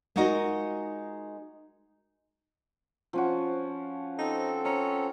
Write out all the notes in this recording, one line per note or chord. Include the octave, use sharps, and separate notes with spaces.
G#3 D#4 F4 F#4 A#4 D#5
F3 C#4 F#4
C4 D#4 A4
C#4 A#5